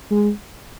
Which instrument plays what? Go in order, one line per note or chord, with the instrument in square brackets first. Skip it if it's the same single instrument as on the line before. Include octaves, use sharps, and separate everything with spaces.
[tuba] G#3